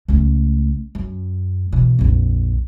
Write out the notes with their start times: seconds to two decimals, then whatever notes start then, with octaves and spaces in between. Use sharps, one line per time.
0.08 C#2 A3
0.95 F#2
1.72 B2 E3
1.99 A#1 F2